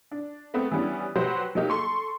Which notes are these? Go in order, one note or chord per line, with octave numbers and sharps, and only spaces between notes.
D4
A3 B3 C4
E3 G3 B3 C#4 D4
F#3 G4 B4 C5 F#5
F#3 A#3 D#4 G4
A4 C6 C#6